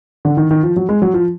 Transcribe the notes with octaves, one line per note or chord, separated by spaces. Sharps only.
D3
D#3
D#3
F3
F#3
G#3
F#3
F3